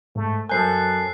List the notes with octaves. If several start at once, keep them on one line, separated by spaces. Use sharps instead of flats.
G#2 A3
F#2 A4 A#4 C5 G#5 F#6 G6 C7